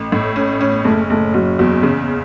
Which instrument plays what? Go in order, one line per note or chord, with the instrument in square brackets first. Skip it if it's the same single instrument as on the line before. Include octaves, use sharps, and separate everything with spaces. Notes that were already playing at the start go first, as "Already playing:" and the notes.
Already playing: [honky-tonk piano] A1
A2
C#4
C#4
[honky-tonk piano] F#1 [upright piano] A3
[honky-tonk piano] F#1 [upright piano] A3
[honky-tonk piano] F#1 [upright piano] F#3
[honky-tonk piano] E2 [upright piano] F#3
[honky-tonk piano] C#3